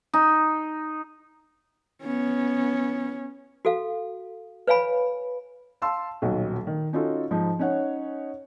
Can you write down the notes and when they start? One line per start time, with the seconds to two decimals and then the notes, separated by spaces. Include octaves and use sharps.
0.14 D#4
2.03 B3 C#4
3.65 F#4 A4 F5
4.67 B4 C#5 F5 G#5 B5
5.82 F5 A5 C6 E6
6.22 D#1 B1 F#3 F#4
6.67 D#3
6.93 C#4 D#4 F4 F#4 A4
7.31 G#2 F3 G#3 D#4
7.59 C#4 D#4 C#5 F#5